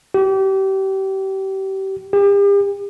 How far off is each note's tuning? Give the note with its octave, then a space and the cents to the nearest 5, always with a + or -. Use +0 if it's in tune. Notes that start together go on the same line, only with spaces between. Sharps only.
G4 -30
G4 +40